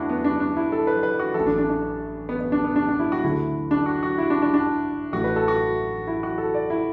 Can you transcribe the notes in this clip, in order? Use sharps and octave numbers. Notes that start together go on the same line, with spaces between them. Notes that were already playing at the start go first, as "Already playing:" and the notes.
Already playing: E2 E3 A3 D4 E4 F#4
B3
D4
D4
E4
A4
B4
B4
F#4
A1 A2 E3 A4
D4
D4
D4
B3
B3
D4
B3
D4
D4
E4
F#4
D2 D3 A3 E4
D4
F#4
F#4
E4
D4
D4
D4
A1 A2 E3 A3 F#4
B4
A4
F#4
E4
F#4
A4
D5
E4